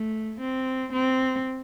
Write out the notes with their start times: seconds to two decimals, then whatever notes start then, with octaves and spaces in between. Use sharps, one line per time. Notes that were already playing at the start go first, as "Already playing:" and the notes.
Already playing: A3
0.39 C4
0.92 C4